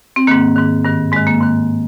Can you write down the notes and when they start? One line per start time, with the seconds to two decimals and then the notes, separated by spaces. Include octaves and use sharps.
0.16 C4
0.27 G#2 D#3 A#3
0.56 G#2 D#3
0.85 G2 D#3
1.12 G#2 G#3
1.17 D#3
1.27 A#3
1.41 G#2 D#3